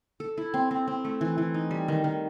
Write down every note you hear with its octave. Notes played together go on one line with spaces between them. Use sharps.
A4
E4
C4
C4
C4
A3
E3
E3
D#4
G3
D#3
D#3